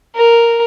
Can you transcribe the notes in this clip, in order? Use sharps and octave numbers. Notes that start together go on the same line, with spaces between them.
A#4